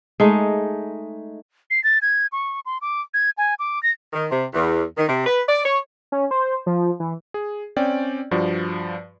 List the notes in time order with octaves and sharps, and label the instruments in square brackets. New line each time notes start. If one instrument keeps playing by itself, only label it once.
[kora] G#3 A3 D#4
[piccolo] C7
A6
G#6
C#6
C6
D6
G#6
G#5
D6
A#6
[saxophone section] D#3
C3
E2
D#3
C3
B4
D5
C#5
[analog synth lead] C#4
C5
F3
E3
[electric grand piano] G#4
C4 C#4 D5 G5
G2 F3 F#4 D5